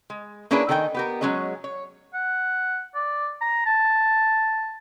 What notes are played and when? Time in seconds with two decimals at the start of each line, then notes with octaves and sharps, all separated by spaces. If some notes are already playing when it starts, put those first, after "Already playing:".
0.10 G#3
0.51 A#3 C#4 D4 E4 G#4 B4
0.69 D#3 A4 D#5 G5 G#5
0.95 B3 G4 A#4
1.21 F#3 G#3 C#4 G#4 D#5
1.64 C#5
2.14 F#5
2.95 D5
3.41 A#5
3.66 A5